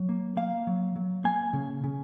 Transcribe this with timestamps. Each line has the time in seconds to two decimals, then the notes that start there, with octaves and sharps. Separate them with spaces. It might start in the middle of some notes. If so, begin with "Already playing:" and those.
Already playing: F#3
0.09 A#3
0.37 A#3 F5
0.67 F#3
0.96 F#3
1.24 A#3 G#5
1.53 C#3
1.84 C#3